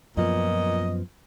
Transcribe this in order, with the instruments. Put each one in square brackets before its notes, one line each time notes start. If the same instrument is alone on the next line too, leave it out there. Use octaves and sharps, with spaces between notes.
[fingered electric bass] F#2 F3 B3 [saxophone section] A#2 D#5